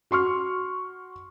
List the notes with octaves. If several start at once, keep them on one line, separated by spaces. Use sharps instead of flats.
F#4 C6 C#6 F6